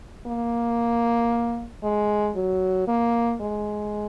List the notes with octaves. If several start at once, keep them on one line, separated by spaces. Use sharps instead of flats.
A#3
G#3
F#3
A#3
G#3